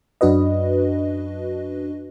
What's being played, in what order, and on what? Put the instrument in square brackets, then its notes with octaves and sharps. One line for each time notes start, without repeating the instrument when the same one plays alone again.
[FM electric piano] F#2 D4 F#4 B4 D#5